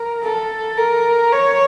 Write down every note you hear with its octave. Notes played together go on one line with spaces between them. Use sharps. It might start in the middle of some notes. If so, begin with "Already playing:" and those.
Already playing: A#4
A4
A#4
C#5